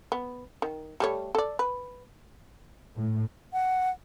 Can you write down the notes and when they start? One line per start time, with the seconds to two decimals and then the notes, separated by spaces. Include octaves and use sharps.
0.12 B3
0.62 D#3
1.00 G3 A3 C#5
1.35 A4 D5
1.59 B4
2.95 A2
3.53 F#5